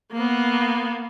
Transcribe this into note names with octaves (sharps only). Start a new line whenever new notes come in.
A#3 B3